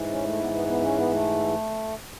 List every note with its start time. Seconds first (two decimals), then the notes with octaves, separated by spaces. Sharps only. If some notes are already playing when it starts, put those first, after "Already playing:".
Already playing: G#2 E3
0.09 C#4
0.24 A3
0.39 B3
0.53 B3
0.67 B3
0.82 C#4
0.97 B3
1.11 A3